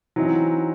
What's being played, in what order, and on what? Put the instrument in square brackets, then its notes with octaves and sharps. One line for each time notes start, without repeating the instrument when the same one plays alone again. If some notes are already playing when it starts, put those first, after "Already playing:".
[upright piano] E3 [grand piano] F#3 C4 D#4